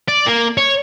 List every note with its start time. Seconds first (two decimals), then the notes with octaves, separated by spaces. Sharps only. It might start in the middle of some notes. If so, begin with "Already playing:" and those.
0.08 D5
0.27 A#3
0.57 C#5